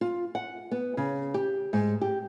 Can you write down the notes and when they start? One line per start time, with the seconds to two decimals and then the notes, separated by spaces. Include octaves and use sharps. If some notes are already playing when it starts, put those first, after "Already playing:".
0.01 F4
0.35 F#5
0.71 B3
0.97 C#3
1.34 G4
1.73 G#2
2.01 G4